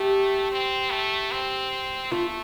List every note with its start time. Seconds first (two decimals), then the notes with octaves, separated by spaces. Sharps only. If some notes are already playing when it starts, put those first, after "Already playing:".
Already playing: A3 G4
0.52 C4
0.92 A3
1.32 C4
2.12 A3 F4